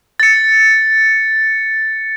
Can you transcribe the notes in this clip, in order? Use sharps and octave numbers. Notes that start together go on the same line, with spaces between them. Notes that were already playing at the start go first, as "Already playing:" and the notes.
A6 C#7